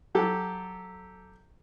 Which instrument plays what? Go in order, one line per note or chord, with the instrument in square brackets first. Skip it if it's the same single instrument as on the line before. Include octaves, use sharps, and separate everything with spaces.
[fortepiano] F#3 G4 A4